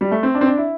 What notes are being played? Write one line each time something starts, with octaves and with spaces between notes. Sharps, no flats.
G3
A3
C4
D4
C4
D4
E4